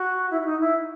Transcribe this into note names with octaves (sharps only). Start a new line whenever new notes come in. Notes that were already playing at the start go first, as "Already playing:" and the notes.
Already playing: F#4
E4
E4
D#4
E4